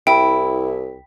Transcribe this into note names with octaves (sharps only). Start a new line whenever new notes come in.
C2 E4 G5